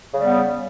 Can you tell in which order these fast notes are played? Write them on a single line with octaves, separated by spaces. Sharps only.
C#3 G3 B3